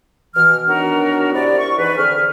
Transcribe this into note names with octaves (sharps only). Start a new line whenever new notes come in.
B2 E3 F6
D#3 F#3 B3 D4 F#4 A#4
C3 E4 D5
C#6
G#2 E3 B4
D3 C4 G#4 F6